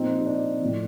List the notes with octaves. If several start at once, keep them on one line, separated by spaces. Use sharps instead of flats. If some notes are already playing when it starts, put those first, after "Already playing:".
Already playing: A#2 F3 C4 D#4
D#4
D4
A2 F3